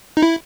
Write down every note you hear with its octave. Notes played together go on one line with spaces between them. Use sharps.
D#4
E4